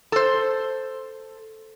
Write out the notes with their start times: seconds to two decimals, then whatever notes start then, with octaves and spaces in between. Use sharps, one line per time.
0.12 A4 C5